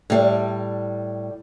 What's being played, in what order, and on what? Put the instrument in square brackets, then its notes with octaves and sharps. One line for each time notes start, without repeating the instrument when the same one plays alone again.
[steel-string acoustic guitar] A2 G3